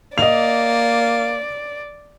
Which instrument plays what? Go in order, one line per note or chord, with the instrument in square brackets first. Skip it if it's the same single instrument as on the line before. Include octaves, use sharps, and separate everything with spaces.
[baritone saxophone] A#3 [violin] D5 [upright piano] D#5 F7